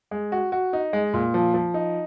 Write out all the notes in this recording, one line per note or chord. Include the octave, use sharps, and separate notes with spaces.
G#3
F#4
F#4
D#4
G#3
A#2
F3
F3
D#4